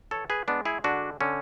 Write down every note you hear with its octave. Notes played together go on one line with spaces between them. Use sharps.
E3 A4 C#5
G#4 B4
G#3 B3 D4
E4 G#4
D3 D4 F#4
D3 C#4